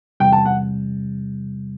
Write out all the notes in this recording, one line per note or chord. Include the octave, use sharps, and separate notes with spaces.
E2 C3 G3 G5
A5
F#5